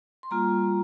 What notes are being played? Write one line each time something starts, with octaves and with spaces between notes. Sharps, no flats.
C6
G3 A#3 F4 A#5